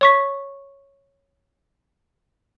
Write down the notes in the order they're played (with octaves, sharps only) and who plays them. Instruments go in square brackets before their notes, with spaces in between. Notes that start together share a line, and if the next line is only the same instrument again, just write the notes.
[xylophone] C#5 C#6 B6